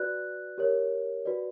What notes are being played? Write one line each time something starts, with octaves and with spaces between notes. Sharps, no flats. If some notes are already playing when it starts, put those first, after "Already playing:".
Already playing: F#4 B4 D5 F#6
G4 A#4 C#5
F#4 B4 D5